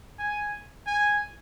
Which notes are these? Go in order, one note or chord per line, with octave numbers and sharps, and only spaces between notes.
G#5
G#5